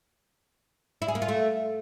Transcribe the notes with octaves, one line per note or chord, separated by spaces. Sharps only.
E4
G#4
A#3
F4
A3